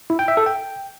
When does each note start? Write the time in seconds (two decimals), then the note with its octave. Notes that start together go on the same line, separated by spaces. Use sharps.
0.10 E4
0.19 G5
0.28 E5
0.37 A4
0.46 G5